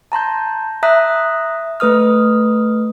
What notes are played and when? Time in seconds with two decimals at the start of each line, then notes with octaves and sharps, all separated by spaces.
0.12 A5 A#5 C6 G6
0.83 E5 A#5 D#6 F#6 B6
1.80 A3 B4 D#6 F6